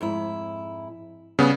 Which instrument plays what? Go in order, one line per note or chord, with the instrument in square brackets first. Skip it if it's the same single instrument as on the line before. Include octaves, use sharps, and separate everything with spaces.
[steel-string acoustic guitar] F2 G#2 E4
[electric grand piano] C#3 B3 [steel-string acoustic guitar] G3 D4